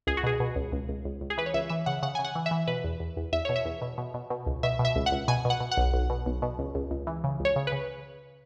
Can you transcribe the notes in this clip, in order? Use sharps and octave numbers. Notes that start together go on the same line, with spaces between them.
C#2 G#4
F#4
B2 G#4
B2
C#2
C#2
C#2
C#2
C#2
G#4
E3 B4
C#5
C#2 E5
E3 E5
C#3 F#5
C#3 F#5
C#3 G#5
F#5
E3
E5
E3
B2 B4
E2
E2
E2
E2 E5
B2 C#5
E5
E2
B2
B2
B2
B2
C#2
B2 E5
B2
E5
C#2
F#5
C#2
B2 G#5
B2
F#5
B2
F#5
B1
B1
B2
B1
B2
C#2
C#2
C#2
E3
C#3
C#2
C#5
C#3
B4
C#3